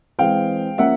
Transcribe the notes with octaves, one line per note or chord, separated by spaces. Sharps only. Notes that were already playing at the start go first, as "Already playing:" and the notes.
E3 G#3 C4 F5 G5
F3 A#3 C#4 E5 F#5